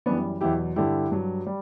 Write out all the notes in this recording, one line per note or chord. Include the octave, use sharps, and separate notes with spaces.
F#2 E3 G3 B3 D4
E2 B2 F#3 E4 G4
G2 D3 G3 E4 G4
G2 F#3
G3